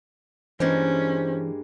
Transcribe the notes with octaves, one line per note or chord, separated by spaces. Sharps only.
G2 E3 G#3 A#3 C#4 C5